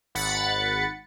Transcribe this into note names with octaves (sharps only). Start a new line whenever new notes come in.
G#1 F#5 B5 A6 C#7